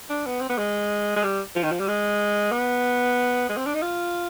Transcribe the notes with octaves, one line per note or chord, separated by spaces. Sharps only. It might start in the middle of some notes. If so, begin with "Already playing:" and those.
D4
B3
C4
B3
G#3
G#3
G3
F3
D#3
F3
G3
G#3
B3
G#3
C4
D4
D#4
F4